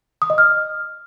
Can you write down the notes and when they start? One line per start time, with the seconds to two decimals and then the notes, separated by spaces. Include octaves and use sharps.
0.22 D#6
0.30 D#5
0.38 F6